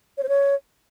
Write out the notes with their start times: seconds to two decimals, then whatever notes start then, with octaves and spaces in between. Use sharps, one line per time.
0.18 C#5
0.23 C5
0.29 C#5